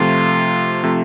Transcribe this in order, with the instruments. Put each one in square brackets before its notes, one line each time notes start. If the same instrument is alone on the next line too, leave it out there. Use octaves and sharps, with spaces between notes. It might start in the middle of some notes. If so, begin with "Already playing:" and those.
Already playing: [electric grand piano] C3 F3 A3 [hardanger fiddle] F4
[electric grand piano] C3 F3 A3